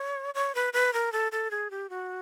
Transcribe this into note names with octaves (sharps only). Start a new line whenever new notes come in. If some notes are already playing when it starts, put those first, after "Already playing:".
Already playing: C#5
C#5
B4
B4
A#4
A4
A4
G#4
G4
F#4